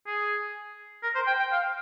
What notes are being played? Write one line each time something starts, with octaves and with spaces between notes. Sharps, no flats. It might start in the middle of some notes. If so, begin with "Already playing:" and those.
G#4
A#4
C5
G5
G5
F5